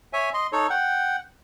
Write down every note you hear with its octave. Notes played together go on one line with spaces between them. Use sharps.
C#5 E5 G#5
D#5 C6
D#4 A4 C#5
F#5 G5